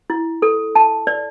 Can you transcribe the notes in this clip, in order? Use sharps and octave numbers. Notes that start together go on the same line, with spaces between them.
E4
A4
A5
D5